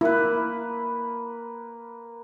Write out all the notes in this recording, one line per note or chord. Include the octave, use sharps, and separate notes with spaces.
A#3 E4 B4